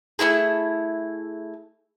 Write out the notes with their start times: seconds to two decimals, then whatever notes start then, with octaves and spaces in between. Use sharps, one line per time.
0.19 A3 C#4 E4 G#4